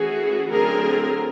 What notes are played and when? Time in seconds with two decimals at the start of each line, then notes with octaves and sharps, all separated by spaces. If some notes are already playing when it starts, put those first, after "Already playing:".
Already playing: E3 A3 C#4 F#4 G#4
0.51 D3 F#3 A3 C4 G#4 A#4